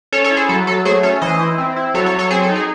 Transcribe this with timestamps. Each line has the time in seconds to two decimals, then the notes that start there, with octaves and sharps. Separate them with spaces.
0.12 C#4 A4 C#5
0.24 A4 C#5
0.31 E4
0.37 G#4 C5
0.49 F#3 A4
0.67 F#3 A4
0.85 A3 G#4 C5
1.03 C#4 A4 C#5
1.22 E3 C5 D#5
1.40 E4
1.58 C4
1.76 E4
1.94 F#3 A4 C#5
2.06 A4 C#5
2.13 F#3
2.19 A4 C#5
2.31 C4 G#4 C5
2.43 A4
2.49 D#4
2.56 G#4